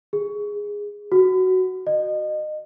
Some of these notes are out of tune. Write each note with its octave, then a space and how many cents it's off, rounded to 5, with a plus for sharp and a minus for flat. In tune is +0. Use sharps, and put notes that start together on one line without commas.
G#4 -10
F#4 +10
D#5 -30